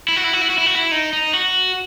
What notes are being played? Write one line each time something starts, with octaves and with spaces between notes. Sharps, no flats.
E4
F#4
E4
F#4
E4
F#4
E4
F#4
E4
D#4
D#4
F#4